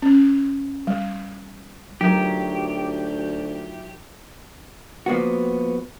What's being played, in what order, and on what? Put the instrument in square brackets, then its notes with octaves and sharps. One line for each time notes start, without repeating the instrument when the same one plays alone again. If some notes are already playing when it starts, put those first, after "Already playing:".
[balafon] C#4
G3
[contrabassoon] D2 [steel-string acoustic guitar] F#3 A#4 [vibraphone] D#4 F4 E5 [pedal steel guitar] G4
[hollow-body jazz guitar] F3 A#3 B3 F#4